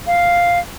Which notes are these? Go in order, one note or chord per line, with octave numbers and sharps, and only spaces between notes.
F5